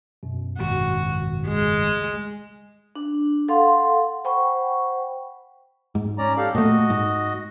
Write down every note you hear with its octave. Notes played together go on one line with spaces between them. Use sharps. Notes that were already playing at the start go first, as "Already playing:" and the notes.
F#2 B2
G#1 C#2 F#4
G#3
D4
A4 F5 F#5 C6
C5 F#5 G5 B5 C#6
G#2
C#4 D5 A#5
G4 A4 F5
A#2 A3 F#4 D#5
G#2